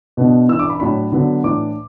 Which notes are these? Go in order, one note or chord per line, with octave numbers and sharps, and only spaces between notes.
B2 B3 D4
E3 D4 E6
D6
B5
A2 F#3 D4 B5
D3 F#3 B3 D4
A2 E3 D4 D6